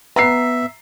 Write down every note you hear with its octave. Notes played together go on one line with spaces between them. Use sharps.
B3 E5 A#5 C7